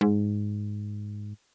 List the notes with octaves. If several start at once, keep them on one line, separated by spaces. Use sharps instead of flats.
G#2